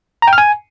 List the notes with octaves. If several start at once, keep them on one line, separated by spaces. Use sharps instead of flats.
A#5
G5
F6
G#5